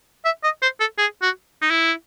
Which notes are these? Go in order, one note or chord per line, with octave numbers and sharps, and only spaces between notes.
E5
D#5
C5
A4
G#4
F#4
D#4
E4